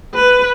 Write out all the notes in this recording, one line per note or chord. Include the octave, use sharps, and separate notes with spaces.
B4